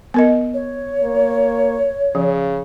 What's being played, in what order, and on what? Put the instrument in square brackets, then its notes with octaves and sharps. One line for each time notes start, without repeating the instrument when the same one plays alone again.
[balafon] B3 A#4 D#5
[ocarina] C#5
[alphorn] A#3
[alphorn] C#3 [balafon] F3